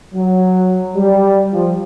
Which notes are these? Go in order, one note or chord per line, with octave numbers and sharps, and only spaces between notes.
F#3
G3
F3